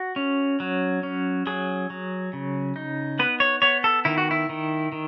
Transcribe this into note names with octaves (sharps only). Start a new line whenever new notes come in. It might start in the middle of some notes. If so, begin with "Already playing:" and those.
Already playing: F#4
C#4
F#3
C#4
F#3 G#4
F#3
C#3
D#4
B3 B4
C#5
B3 C#5
A4
D#3 E4
F#4
E4
D#3
D#3